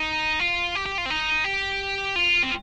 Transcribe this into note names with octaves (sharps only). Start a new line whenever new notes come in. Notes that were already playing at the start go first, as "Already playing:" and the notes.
Already playing: D#4
F4
G4
G4
F4
C4
D#4
G4
F4
C4